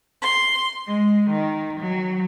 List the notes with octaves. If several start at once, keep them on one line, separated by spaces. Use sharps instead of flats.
C6
G#3
D#3
F#3